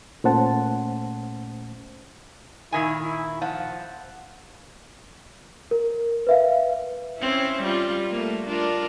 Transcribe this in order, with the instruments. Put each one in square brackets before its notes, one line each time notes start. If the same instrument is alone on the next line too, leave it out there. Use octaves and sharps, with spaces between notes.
[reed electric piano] A#2 A3 C#4 C5 F#5 A5
[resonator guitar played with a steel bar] A#2 D#3 G#5 [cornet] E4
[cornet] E4
[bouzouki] F3 [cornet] F#5
[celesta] A#4
B4 E5 F5
[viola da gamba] C4 C#4 E4
G3 F4
A3 A#3
D4 F4 A#4